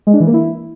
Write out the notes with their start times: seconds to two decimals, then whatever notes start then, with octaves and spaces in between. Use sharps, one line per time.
0.07 G#3
0.14 D4
0.20 E3
0.27 A#3
0.34 E4